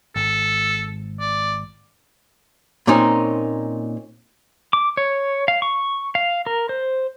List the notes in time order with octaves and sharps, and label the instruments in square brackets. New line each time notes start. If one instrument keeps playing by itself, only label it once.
[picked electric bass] G#1 [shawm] A4
[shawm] D5
[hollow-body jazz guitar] A#2 C4 C#4 D#4
[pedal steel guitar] D6
C#5
F5
C#6
F5
A#4
C5